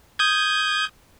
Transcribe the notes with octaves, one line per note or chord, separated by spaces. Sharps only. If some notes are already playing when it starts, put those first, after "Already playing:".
D#6 G6 G#6